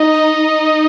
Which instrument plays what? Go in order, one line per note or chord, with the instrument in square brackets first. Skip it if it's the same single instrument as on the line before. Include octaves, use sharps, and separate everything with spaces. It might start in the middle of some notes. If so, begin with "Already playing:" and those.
Already playing: [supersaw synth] D#4 [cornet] D#5
[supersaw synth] D#4